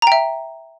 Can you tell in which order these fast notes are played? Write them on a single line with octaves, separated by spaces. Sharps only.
A#5 G5 E5